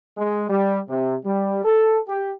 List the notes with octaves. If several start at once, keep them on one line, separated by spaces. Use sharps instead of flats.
G#3
G3
C3
G3
A4
G4